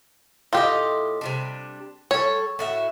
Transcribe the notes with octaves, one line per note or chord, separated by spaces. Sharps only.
A2 F4 G4 G#4 D#5
C3 G3 D4
G3 A4 C#5
A2 F#4 E5